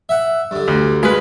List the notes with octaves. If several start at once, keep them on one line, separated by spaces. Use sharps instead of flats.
E5 F#5
G2 D3
D2
G#3 F4 B4